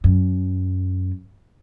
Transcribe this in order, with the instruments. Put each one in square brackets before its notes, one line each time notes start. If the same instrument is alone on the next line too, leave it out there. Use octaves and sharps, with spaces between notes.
[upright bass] F#2